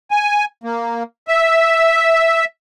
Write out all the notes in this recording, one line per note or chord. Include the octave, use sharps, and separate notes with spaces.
G#5
A#3
E5